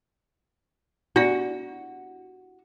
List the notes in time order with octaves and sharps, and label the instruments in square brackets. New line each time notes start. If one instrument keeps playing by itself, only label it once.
[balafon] B3 D4 D5 [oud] F#4